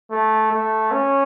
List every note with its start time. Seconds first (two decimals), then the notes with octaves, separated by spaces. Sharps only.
0.11 A3
0.52 A3
0.91 C#4